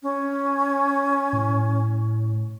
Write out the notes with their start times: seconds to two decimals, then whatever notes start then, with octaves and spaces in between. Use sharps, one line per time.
0.03 C#4
1.33 A2